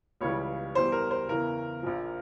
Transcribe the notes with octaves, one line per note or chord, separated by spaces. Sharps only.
C#2 C#3 E3 G3 C#5
E2 E3 G3 C5
A#4
C5
E2 C#3 E3 A#4
A#1 A#2 F3